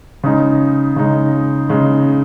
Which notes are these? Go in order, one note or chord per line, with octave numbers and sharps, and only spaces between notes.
C#3 G#3 D#4
C#3 G#3 D#4
C#3 G#3 D#4